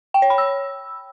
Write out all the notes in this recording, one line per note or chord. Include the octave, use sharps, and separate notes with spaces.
G5
C#5
B5
E6